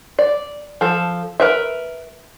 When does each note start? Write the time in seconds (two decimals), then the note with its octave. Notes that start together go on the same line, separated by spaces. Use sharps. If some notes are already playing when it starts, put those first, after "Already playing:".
0.19 D5
0.81 F3 A4
1.40 A#4 B4 E5